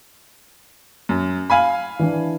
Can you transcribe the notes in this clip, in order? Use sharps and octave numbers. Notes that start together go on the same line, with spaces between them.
F#2
F5 G#5 B5
E3 D4